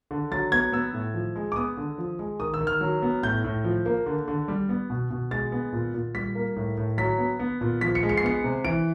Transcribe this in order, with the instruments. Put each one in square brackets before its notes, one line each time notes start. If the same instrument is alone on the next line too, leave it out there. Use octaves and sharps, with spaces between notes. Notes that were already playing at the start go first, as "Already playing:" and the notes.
[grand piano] D3
F#3 A6
B3 G#6
B3 E6
A2
F3
G#3
D6
B3 D#6
D3
F3
G#3
D#3 D#6
E6
D#3
F6
F#3
B3
A2 G6
A2
F3
A#3
D3
D3
G3
B3
B2
B2
G#3 A6
B3
A#2
A#2
G3 B6
A#3
A2
A2
F#3 B6
B3
B3
A#2
F3 B6
C#7
G#3
C#7
C7
B3 C#7
C3
E3 D7